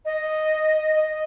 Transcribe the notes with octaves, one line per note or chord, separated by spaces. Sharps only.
D#5
D#5